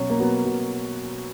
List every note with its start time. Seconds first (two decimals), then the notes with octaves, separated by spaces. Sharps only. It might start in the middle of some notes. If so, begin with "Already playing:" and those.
Already playing: B2 F#3 C#4
0.09 A#3
0.20 F#3 B3
0.45 B2